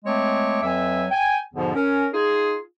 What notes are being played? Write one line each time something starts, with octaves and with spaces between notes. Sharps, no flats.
G#3 A3 C4 C#5 D6
F2 F#3 B4 E5 G#5
G5 G#5
E2 G#2 B2 D3 F3
C#4 A#4
D#4 F4 G#4